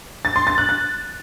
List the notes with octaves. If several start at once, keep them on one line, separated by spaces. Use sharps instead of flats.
A6
C6
A6
F#6
A6